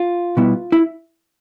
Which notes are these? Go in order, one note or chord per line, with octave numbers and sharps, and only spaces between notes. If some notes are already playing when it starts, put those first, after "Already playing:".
Already playing: F4
B2 G3 B3 E4
E4